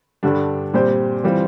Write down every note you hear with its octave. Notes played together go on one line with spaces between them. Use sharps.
G2 D3 G3 D4
A#2 G3 C4 G4 C5
E3 G3 C4 F4